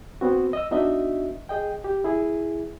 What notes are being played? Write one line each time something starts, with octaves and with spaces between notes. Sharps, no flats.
B3 C4 F#4
D#5 E6
B3 D4 D#4 F#4 D#5 E5
G#4 D#5 G5
G4
E4 G#4